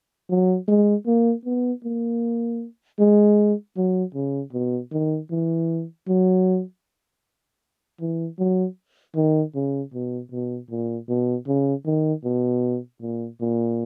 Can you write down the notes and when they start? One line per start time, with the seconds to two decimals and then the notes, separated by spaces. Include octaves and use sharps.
0.30 F#3
0.68 G#3
1.06 A#3
1.45 B3
1.84 A#3
2.99 G#3
3.77 F#3
4.15 C#3
4.53 B2
4.92 D#3
5.31 E3
6.08 F#3
8.01 E3
8.39 F#3
9.16 D#3
9.55 C#3
9.94 B2
10.32 B2
10.71 A#2
11.09 B2
11.47 C#3
11.86 D#3
12.24 B2
13.01 A#2
13.41 A#2